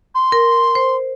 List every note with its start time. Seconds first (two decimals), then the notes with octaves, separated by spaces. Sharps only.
0.15 C6
0.32 A#4
0.75 C5